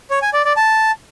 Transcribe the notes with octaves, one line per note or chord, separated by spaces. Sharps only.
C#5
G#5
D5
D5
A5